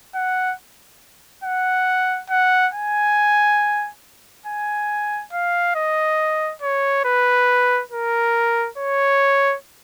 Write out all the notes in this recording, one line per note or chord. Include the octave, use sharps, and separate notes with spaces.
F#5
F#5
F#5
G#5
G#5
F5
D#5
C#5
B4
A#4
C#5